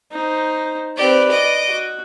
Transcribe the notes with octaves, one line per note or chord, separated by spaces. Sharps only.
D#4 C5
C4 G4 B4 D5
D#5 D6
F#4